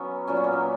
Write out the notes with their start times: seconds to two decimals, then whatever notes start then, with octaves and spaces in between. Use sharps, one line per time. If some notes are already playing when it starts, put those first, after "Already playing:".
Already playing: F#3 B3 C#4
0.27 A#2 F#3 C#4
0.37 B3
0.44 A#3
0.53 B3